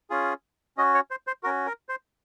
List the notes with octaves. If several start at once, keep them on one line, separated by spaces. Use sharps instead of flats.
C#4 F4 G#4
C#4 F#4 D#5
C#5
C5
C5
C#4 F#4 A#4
A#4
C5